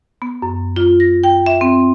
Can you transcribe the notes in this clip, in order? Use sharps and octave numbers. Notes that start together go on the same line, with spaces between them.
B3
F#2
F4
A#6
G5
E5
C4